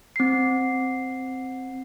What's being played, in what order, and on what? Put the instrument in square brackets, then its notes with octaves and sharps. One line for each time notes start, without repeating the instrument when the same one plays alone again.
[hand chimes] C4 C7